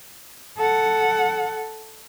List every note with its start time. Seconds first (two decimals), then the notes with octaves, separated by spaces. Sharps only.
0.58 A4 F#5